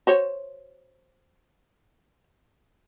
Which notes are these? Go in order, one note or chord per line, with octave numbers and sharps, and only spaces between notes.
F#4 C5 C#5